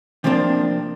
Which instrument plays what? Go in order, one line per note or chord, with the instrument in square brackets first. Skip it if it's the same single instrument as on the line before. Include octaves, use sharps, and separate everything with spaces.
[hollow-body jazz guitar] C3 F3 A#3 C4 D4